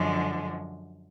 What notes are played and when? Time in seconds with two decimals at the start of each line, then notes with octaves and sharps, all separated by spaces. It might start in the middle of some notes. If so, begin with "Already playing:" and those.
Already playing: F#2 D3 F3 G#3